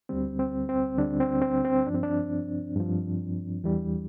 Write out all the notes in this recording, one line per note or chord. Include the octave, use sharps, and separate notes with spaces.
D2 D3 G3 C4
C4
C4
D2 D3 G3 D4
C4
C4
C4
G2 F3 D4
C4
D4
G2 F3
E2 E3 G3